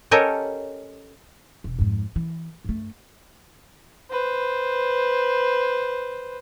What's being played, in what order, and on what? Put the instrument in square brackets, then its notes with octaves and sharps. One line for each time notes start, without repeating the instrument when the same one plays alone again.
[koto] C#4 G4 A4 A#4 C#5 D#5
[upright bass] E1
F2 G#2
E3
G2 A3
[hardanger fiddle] B4 C5